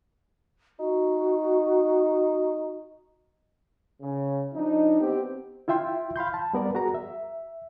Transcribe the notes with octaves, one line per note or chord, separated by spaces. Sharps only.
D#4 F#4
C#3
F3 D4 D#4
B3 C4 G4
E4 F4 E5 G5 C6
F5 B5 C6 G6
A5
G3 B3 A#4 D5
F#4 G#4 A#4 A#5
E5